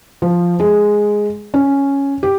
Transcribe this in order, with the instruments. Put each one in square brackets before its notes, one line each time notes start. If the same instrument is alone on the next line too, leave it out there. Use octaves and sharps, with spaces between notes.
[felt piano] F3
G#3
C#4
G4